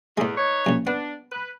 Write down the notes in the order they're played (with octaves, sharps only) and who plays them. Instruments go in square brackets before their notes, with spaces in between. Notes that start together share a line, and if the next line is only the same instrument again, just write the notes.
[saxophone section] E2 [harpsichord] A2 G#3
[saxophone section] D#4 B4 C#5
[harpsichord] A#1 F#2
[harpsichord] B3 [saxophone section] D4
[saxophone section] B4